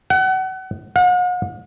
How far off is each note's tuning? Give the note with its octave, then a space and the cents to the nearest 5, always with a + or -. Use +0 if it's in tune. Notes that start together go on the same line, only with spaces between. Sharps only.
F#5 +30
F#5 -45